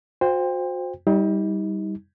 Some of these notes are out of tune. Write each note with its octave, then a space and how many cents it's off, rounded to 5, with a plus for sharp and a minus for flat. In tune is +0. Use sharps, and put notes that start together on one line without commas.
F#4 -35 C5 -5 G5 +30
G3 +0 D#4 +35